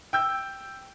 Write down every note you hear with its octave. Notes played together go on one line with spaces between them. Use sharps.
G5 E6 G6